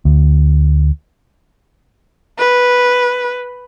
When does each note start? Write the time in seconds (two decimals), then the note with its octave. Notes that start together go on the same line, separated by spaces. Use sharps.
0.05 D2
2.38 B4